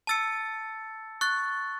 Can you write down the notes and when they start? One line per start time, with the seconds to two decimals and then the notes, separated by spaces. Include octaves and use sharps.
0.07 A5 E6 A6 C#7
1.21 C#6 F#6 A6